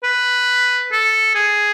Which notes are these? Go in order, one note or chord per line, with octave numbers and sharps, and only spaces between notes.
B4
A4
G#4